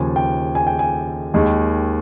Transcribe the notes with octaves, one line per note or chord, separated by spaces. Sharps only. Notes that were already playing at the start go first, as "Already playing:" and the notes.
Already playing: D#2 C#3 F3 G#5
G5
G#5
G5
G#5
D#2 D#3 G#3